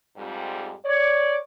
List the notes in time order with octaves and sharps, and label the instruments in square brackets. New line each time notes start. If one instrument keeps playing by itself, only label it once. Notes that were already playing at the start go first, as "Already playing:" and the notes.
[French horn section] F2 G#2 G3
[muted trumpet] C#5 [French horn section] D5